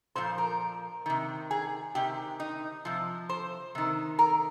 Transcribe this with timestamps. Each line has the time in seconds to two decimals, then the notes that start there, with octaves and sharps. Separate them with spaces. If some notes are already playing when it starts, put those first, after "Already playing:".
0.15 A#2 F3 C5
0.38 A#4
1.06 C3 D#3
1.51 G#4
1.95 C3 D#3 G4
2.40 D#4
2.85 C3 F3
3.29 C5
3.75 C3 D#3
4.19 A#4